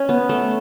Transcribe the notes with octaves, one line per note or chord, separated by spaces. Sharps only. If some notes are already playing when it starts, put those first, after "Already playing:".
Already playing: C#4
B3
A3